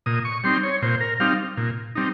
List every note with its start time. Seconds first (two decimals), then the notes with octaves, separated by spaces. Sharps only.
0.06 A#2 D#6
0.25 C#6
0.44 G3 C4 D#4 C6
0.63 C#5
0.82 A#2 C5
1.01 A#4
1.20 G3 C4 D#4 F5
1.57 A#2
1.95 G3 C4 D#4